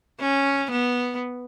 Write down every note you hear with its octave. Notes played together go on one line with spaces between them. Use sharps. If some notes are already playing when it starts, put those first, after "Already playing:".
C#4
B3